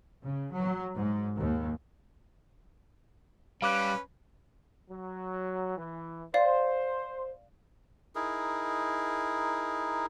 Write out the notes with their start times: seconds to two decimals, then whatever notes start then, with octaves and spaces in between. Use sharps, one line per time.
0.23 C#3
0.53 F#3
0.94 G#2
1.38 D#2
3.62 G3 C#4 B4 F5 D6 F#6
4.90 F#3
5.77 E3
6.34 C5 D5 F5
8.15 D#4 E4 G#4 A#4